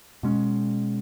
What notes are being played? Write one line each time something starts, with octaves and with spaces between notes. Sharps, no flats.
B2 G#3 C#4